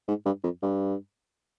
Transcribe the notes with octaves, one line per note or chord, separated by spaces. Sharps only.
G#2
G2
F2
G2